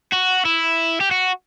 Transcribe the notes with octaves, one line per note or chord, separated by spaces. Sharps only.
F#4
E4
G4
F#4